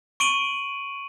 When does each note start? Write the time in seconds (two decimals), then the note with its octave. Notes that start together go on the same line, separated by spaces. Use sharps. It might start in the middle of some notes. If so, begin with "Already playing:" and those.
0.20 C#6 D7 D#7 F#7